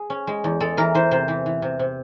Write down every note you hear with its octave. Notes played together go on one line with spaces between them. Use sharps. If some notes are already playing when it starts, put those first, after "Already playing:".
Already playing: G#4
C#4
G#3
E2
G#3 A4
E3 A#4
E3 C5
C3 C5
E3
E3
C3
C3